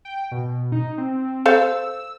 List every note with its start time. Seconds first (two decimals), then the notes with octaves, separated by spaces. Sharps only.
0.05 G5
0.31 B2
0.72 D#4
0.98 C4
1.46 A4 C5 F5 E6